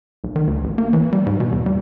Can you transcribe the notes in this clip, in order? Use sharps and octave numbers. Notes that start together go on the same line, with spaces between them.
B1
D#3
D2
A1
A#3
E3
G3
G#2
B2
E2
G3